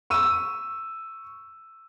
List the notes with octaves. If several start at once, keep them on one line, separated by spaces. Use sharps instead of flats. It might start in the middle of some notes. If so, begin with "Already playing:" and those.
C#6 E6 D#7